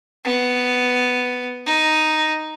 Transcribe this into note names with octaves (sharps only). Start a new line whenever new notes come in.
B3
D#4